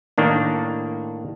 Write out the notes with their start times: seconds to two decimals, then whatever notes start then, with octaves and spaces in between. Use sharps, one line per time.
0.18 A2 D#3 A#3 D4